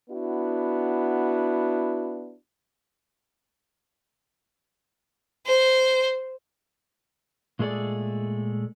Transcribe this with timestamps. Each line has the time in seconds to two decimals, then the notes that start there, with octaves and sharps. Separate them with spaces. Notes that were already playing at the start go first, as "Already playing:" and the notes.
0.10 B3 D4 E4 F#4
5.47 C5
7.59 A#2 G#3 A3 G#4 A4 D5